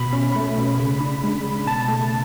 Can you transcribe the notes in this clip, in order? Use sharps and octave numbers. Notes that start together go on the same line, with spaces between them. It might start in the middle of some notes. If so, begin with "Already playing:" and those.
Already playing: B2 B5
C#4
A3
B2
C#3
D4
G#3
C#3
B2 A5
A3